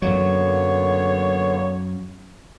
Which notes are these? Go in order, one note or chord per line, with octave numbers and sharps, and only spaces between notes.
F#2 D3 F#3 A#3 B3 C#5